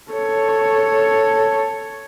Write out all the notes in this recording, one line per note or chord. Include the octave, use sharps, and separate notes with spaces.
A4 C#5